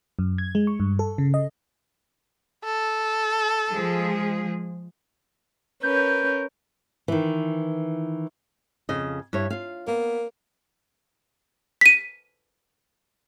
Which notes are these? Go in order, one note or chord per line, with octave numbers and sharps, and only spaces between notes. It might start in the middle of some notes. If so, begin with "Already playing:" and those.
F#2
G#6
G#3
C#6
G2
A4
C#3
D#5
A4
F3 G#3 G#4
C#4 A#4 B4 G6
D#3 E3
F2 C#3 D#5
G2 E4 C#5
F4 F5
A#3 B3
B6 D#7